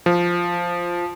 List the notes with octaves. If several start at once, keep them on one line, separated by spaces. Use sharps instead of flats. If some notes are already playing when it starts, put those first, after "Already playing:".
F3